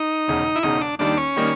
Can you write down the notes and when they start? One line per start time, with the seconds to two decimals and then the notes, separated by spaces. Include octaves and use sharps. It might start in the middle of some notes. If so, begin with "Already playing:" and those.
Already playing: D#4
0.28 E1 E2 C#3
0.56 E4
0.63 E1 E2 C#3 D#4
0.81 D4
0.99 D#2 D#3 G3 A#3 D4 D#4
1.17 C#4
1.36 D#3 G3 A#3 D#4